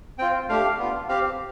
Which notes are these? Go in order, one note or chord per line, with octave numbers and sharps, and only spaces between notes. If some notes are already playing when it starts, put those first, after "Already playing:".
C4 F4 G5
A3 D4 G4 F5
B3 D4 F4
C4 G4 F5